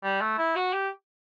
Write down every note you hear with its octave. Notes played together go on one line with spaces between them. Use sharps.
G3
A3
E4
F#4
G4